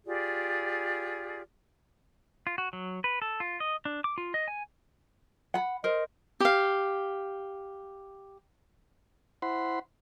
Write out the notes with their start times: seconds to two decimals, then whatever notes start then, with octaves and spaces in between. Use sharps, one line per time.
0.05 F4 G4 G#4 D5
2.47 F4
2.58 F#4
2.73 F#3
3.04 B4
3.22 A4
3.40 F4
3.60 D#5
3.85 D4
4.04 D6
4.18 F4
4.34 D#5
4.48 G#5
5.54 F#5 B5
5.84 A#4 C5 D#5
6.40 G4 F5
9.42 E4 C5 F#5 B5 C6